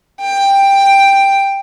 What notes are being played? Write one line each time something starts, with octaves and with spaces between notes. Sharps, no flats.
G5